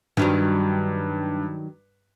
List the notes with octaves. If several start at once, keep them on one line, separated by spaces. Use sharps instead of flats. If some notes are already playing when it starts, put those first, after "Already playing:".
G2 D#3 F#3 G3